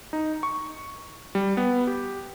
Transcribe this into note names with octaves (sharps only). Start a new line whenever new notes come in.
D#4
C#6
G3
B3
G4